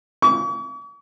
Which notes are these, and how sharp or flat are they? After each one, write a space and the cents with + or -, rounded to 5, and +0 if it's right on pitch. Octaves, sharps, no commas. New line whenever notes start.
C#6 +45